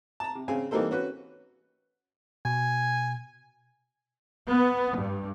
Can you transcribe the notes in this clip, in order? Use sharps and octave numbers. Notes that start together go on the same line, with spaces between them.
A5 A#5
C3
C#3 C4 F5 G#5
E3 G3 A#3 D#4 A4 C5
C#4 F#4 B4
B2 G#5
B3
G2